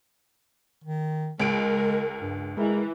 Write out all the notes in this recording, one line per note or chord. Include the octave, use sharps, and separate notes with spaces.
D#3
C#2 G#3 A#4 D7
G2
E3 G#3 A#4